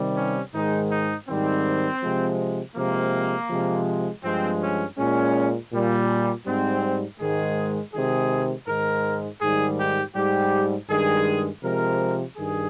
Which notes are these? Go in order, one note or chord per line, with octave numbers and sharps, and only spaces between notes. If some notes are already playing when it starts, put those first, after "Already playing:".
Already playing: C3 D#3 G3
C#4
G#2 D#3 G#3 D#4
D#4
G#2 D#3 G3 C4
C3 F3 G#3
C3 F3 G#3 A#3
C3 F3 G#3
G2 F3 G#3 C4
C#4
A#2 G#3 C#4
A#2 G3
G#2 G3 C4
G#2 D#3 G#3 G#4
C3 D#3 G#3 G#4
G#2 D#3 G#3 A#4
G#2 D#3 G3 G#4
G4
G#2 G3 G4
G2 D#3 G#3 G#4
C3 F3 G#3 A#4
G2 D#3 G#4